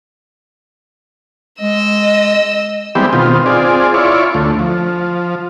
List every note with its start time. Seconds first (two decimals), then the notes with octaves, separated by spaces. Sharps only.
1.61 G#3 D#5 E6
2.95 E3 G3 G#3 B3 C4 G4
3.13 B2 D#3 C4 F4
3.46 C4 F4 G#4 D5
3.94 E4 F4 C#5 D5
4.34 D2 A3
4.59 F3